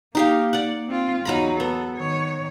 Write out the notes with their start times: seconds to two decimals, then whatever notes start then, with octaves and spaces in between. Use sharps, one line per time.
0.15 A#3 D#4 G4 F5
0.53 D5 F#5
0.87 C4 F4
1.25 E2 F#3 D#4 A#5 B5
1.60 B3 A4
1.97 D#3 C#5